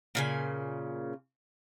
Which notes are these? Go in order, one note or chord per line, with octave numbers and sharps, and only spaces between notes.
A#2 C#3 G#5